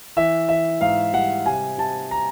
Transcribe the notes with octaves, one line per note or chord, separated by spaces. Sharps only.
E3 E5
E3 E5
G#2 F5
G3 F#5
C3 G#5
C3 A5
A#5